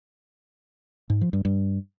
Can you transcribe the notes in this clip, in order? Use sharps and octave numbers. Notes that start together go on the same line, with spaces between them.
G#2
F3
G2
G2